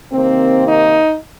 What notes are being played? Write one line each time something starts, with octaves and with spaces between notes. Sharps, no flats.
C3 D#3 A#3 C4
D#4